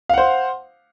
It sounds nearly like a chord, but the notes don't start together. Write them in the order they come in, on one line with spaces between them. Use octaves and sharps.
F5 F#5 C5